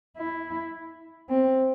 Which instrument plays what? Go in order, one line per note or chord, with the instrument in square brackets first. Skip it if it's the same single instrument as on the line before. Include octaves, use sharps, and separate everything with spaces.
[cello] E4
C4